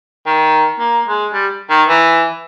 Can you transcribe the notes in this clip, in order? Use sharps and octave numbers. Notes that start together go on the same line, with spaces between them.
D#3
A#3
G#3
G3
D#3
E3